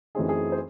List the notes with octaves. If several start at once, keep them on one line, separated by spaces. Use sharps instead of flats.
F#2 E3 A3 C4 D#4 G#4
G#4
C5